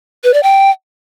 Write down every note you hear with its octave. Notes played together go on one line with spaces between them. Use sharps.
B4
D5
G5